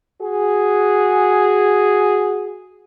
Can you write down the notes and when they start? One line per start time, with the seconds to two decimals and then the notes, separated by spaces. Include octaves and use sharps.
0.22 F#4 G#4